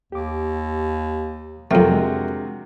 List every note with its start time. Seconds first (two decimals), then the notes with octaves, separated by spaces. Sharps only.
0.12 D#2 G4 D6
1.71 F2 C3 A3 F#4 A#4
1.92 G#3 D4